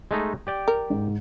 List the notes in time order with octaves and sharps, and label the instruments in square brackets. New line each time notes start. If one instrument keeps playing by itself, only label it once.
[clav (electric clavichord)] G#3 A3 D#4
G4 D5 G5
[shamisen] A#4
[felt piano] G#2